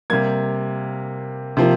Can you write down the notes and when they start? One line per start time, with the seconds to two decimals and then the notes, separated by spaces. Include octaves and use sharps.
0.10 C3 G3 A#3 G#6
1.57 C3 F3 A#3